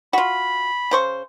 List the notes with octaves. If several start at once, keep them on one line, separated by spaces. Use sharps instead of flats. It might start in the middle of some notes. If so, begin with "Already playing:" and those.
F4 F#4 B5
C#3 C5 C#6